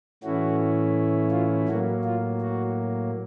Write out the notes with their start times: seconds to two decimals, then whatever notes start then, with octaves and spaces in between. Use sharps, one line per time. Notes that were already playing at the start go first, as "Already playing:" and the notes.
0.23 A2 E3 A3 C#4 E4 F#4
1.31 F4
1.68 A2 F#3 A#3 F#4
2.04 F4
2.40 F#4